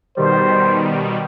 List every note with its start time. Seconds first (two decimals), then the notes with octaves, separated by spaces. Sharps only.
0.17 B2 D#3 G3 C5